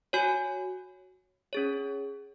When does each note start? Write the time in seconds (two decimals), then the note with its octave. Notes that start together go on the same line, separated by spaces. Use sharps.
0.13 F#4 C#5 G#5
1.53 C#4 G#4 C#5